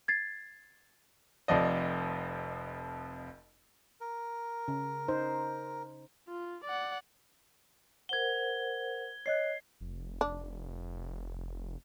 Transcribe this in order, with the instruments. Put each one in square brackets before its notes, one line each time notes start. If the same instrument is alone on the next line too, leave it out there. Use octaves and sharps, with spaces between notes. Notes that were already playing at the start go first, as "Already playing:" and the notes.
[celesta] G#6 A6 C7
[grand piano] F1 F2 F3 D5 D#5
[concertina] A#4
[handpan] C#3
D#4 C5
[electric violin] F4
D5 F#5
[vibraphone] A#4 C5 F#5 [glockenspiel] G#6 G7
[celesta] C#5 D#5 F#6 [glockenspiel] C7
[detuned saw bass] F1
[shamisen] D4